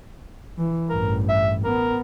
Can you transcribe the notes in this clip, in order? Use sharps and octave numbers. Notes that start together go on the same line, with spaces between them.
E3
A1 G2 A#4
E5
B3 A#4